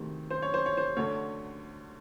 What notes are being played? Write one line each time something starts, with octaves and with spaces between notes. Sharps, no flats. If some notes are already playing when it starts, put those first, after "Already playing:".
Already playing: D2 C3 D#3
C5
C#5
C5
C#5
C5
D2 D3 C#5